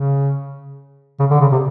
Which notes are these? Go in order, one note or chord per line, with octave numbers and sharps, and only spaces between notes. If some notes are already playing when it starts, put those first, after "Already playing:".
Already playing: C#3
C#3
D3
C#3
C3